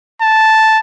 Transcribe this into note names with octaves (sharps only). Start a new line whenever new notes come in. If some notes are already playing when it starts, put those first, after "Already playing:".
A5